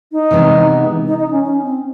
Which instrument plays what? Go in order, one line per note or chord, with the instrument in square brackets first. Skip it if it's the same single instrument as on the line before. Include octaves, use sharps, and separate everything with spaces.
[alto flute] D#4
[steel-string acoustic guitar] C3 E3 G#3 B3
[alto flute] D#4
D#4
C#4
C#4
C4